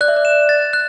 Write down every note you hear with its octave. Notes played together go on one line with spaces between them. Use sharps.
D5 F#6
E5
D5
E7
A6
F#6